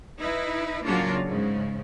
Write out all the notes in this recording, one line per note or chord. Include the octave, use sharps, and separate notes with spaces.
D#4 E4 B4
A2 C#3 F#3 A#3 D4 F4
G#2 C#3